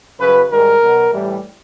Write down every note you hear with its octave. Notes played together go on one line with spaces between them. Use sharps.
F#2 C#3 F#3 B4
G#2 D#3 G3 A#4
B2 F#3
A2 E3 G3